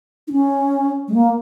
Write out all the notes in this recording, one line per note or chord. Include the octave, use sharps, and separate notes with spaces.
D#4
C#4
G#3
A#3